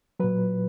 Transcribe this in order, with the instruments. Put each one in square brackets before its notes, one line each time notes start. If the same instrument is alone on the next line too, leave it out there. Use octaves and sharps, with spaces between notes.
[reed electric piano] A#2 F#3 B4